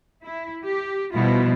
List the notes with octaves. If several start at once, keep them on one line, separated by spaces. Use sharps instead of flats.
E4
G4
B2 F3 G3 E4 F4